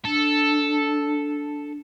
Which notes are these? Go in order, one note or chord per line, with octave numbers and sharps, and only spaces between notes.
D4 A4